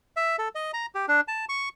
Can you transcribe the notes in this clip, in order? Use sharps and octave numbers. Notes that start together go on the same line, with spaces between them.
E5
A4
D#5
A#5
G4
D4
A5
C#6